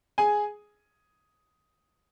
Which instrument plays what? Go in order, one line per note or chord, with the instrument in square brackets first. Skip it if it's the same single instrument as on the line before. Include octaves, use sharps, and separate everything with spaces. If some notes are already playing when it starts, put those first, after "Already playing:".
[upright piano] G#4 G#5